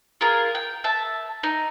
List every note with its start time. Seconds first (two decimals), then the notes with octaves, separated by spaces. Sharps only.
0.21 F4 G#4 A#4
0.55 G5
0.84 E5 A5
1.43 D#4